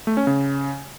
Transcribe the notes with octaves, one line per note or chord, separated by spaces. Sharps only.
A3
C#4
C#3